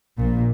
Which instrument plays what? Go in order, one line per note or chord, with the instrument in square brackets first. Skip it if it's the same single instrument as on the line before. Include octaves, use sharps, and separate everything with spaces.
[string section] A#1 A#2